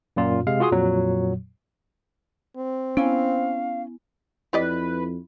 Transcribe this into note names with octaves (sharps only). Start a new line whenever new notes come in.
F#2 A#2 F4
C3 G#3 F5
F4 F#4 G#4 C6 D#6
F2 A#2 F#3
C4
B3 C#4 E4 F5 G#5
F2 E4 G4 B4 D5 D#5